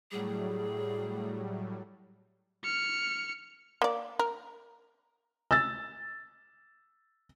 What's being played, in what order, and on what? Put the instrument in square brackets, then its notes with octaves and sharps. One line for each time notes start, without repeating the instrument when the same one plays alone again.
[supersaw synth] A2 F#3 G3 [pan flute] G#4
[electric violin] F6 C#7
[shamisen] A#3 D5
A#4
[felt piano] E6 A6